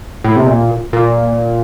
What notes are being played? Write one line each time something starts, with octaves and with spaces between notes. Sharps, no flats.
A2
C3
A#2
A#2